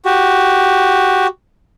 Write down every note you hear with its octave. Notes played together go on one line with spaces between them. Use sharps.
F#4 G4